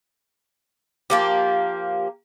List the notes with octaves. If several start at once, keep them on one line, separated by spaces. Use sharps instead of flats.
F3 A#3 G4